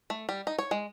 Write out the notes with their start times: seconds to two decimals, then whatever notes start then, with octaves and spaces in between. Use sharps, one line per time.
0.10 A3
0.29 G3
0.47 D#4
0.58 C#5
0.71 G#3